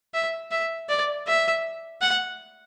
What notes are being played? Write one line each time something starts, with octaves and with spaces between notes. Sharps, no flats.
E5
E5
D5
E5
F#5